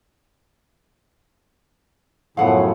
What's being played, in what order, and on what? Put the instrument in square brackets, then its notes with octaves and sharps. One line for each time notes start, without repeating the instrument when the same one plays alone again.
[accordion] F#2 A2 C#3 [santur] F3 A3 B3 [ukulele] F5 F#5